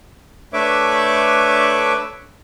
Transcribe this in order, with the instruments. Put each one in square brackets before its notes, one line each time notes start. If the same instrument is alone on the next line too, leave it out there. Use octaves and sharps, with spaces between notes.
[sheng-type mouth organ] A3 D4 B4 C#5 E5 D6